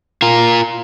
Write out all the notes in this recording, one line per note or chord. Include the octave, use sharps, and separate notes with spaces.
F4 A#4